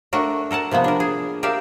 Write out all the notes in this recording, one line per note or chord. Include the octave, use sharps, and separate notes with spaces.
A3 D4 F#4 A#4
A4 A#4 F#5 A5
C3 F3 A#3 B3
D4 A#4
G#4
G4 A#4 D5 E5 F5